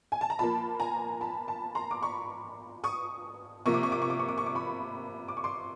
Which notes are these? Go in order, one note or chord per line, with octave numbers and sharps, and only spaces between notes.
G#5
A5
A#5
A#2 F3 A#3 A5 B5
G#5 A#5
A5 B5
A5 B5
A#5 C6
D6
B5 C#6
C#6 D#6
C3 F3 A#3 C#6
D6
C#6
D6
C#6
D6
C#6
D6
C#6
D6
B5 C#6
D6
C#6
C6 D6